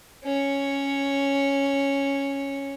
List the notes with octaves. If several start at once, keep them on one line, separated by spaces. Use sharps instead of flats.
C#4 C#5